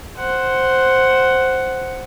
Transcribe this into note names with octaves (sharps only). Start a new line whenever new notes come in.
C5 F#5